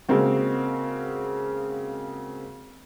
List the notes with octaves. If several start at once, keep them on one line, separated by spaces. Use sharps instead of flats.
C#3 G#3 A#3 C4 F#4